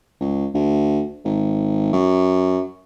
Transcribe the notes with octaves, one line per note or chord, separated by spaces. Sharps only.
C#2
D2
G#1
F#2